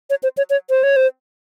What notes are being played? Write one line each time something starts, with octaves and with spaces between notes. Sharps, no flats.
C#5
C5
C#5
C#5
C5
C#5
C5